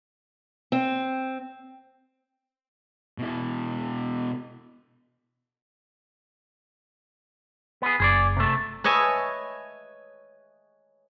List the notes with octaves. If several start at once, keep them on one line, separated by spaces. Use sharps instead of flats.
C4
B2 E4
B3 G#4
F#1 G#4 C5 D5
C3 A3
B4 C#5 D#5 E5 G#5 A5